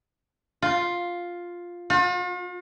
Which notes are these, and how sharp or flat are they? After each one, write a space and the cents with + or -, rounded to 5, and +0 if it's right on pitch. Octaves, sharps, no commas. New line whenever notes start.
F4 +5
F4 +45